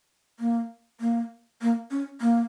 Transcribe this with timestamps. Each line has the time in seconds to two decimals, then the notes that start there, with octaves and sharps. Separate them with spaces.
0.40 A#3
1.01 A#3
1.62 A#3
1.91 C#4
2.21 A#3